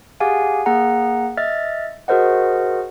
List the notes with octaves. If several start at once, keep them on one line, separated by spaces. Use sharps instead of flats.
G4 G#4 F5 F#5 G#5
A#3 G#4 F#5 A#5
D#5 E5 F6 A6
F#4 G#4 A#4 C5 D#5 F#5